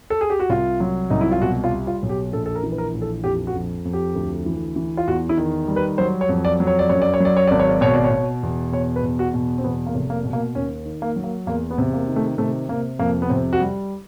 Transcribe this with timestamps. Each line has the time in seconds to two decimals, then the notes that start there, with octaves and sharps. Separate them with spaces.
0.10 A4
0.21 G#4
0.30 G4
0.40 F#4
0.49 C2 F4
0.80 F#3
1.10 C2 D#4
1.21 E4
1.31 F4
1.41 B2 F#4
1.64 F4
1.71 G3
1.87 F4
2.02 B1
2.09 G4
2.32 A#1 A4
2.46 A4
2.55 A#4
2.63 E3
2.72 B4
2.78 A#4
2.94 A#1
3.02 A4
3.24 F2 G4
3.47 F#4
3.54 F2
3.85 F2
3.93 G4
4.15 D2
4.46 E3
4.76 E3
4.97 F4
5.07 E2 F#4
5.29 E4
5.37 D#3
5.68 G3
5.76 B4
5.98 F#3 C5
6.21 C#5
6.29 F2
6.45 D5
6.60 F#3
6.67 C#5
6.79 D5
6.89 F#2 C#5
7.02 D5
7.14 C#5
7.20 F#3 D5
7.37 C#5
7.47 G#1 D5
7.60 C#5
7.70 D5
7.81 B2 C#5
7.94 D5
8.04 C#5
8.11 B2
8.43 E2
8.72 B2 C#5
8.96 B4
9.03 E2
9.19 F#4
9.34 B2
9.58 C4
9.64 E2 B3
9.87 A#3
9.95 F1
10.10 A#3
10.25 B2
10.33 A#3
10.55 D#2 C#4
10.86 D#3
11.02 A#3
11.16 F#3
11.24 A#3
11.46 E2 A#3
11.71 B3
11.78 C3
11.93 A#3
12.08 D#3
12.16 A3
12.38 C3 A3
12.69 C3 A#3
12.99 F2 A#3
13.22 B3
13.30 C3 C4
13.53 F#4
13.60 G3